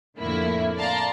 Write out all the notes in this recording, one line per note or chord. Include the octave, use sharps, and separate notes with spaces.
F2 A2 D3 A3 A#3 E4
D5 F5 A5 A#5 C6